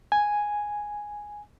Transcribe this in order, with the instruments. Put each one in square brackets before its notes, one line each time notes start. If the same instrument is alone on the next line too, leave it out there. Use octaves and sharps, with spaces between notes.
[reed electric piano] G#5